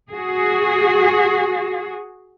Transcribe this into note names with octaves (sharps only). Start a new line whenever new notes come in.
F#4 G#4